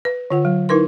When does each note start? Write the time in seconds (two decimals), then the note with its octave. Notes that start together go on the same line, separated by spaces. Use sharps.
0.05 B4
0.30 D3 F4 F#5
0.45 F#3
0.69 D#4 E4 A#4 B4 C6